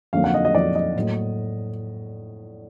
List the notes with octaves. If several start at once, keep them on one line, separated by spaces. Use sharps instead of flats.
F2 D3 F#3 A#3 F5
F#5
D#5
D#5
F2 D3 F#3 A#3 D5
D#5
A2 F#3 A#3